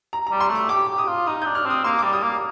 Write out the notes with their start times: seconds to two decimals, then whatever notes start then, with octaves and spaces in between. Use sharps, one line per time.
0.13 A#5
0.27 A#5
0.32 G3
0.40 C6
0.50 A3 D6
0.69 G4 D6
0.89 G4
0.98 D#6
1.08 F4
1.27 D#4 D#6
1.42 D4 G6
1.55 F6
1.66 C4 D#6
1.84 A#3 C6
1.99 G3 D6
2.13 D#6
2.22 A#3